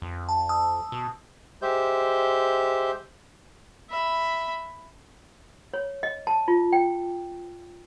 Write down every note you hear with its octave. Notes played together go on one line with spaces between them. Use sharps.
F2
A5
A5 D#6 E6
B2
G#3 G4 C5 E5 G6
E5 B5
C#5
D#5
A5
F4
G5